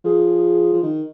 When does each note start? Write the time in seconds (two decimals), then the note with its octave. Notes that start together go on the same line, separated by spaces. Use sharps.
0.04 F3 G#4
0.73 F3
0.83 D#3